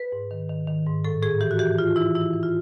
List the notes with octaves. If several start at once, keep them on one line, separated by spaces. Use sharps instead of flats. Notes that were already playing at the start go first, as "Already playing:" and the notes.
Already playing: B4
G#2
D#3
D#3
D#3
G#2
A2 A4
A2 G#4
E3 G4
F#4
E3 G4
E3 F4
E3 E4
E3 E4
E3
F4